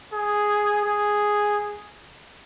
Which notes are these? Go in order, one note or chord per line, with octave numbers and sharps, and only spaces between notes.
G#4
G#4